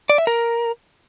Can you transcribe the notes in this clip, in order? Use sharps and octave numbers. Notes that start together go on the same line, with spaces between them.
D5
E5
A#4